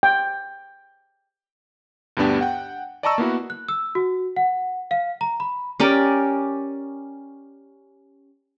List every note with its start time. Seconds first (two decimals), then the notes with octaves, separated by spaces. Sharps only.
0.03 G5
2.17 D2 G2 B3 D4 G4
2.41 F#5 G5
3.03 D5 D#5 A5 A#5 C#6 E6
3.18 A#3 B3 E4 F#4
3.50 F#6
3.68 E6
3.95 F#4
4.36 F#5
4.91 F5
5.21 A#5
5.40 B5
5.80 C#4 G4 A#4 D5